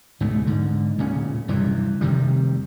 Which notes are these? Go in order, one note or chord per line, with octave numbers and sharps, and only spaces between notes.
C#2 G#2 B2 A3
G#2 D3
D1 A#2 C#3 C#4
F#1 G2 C3 E3
F1 C3 D#3 G3